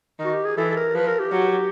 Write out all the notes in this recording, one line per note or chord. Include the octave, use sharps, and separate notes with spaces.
D#3
F#4
G4
G#4
E3 A4
A4
A#4
F3 B4
A#4
G4
F#3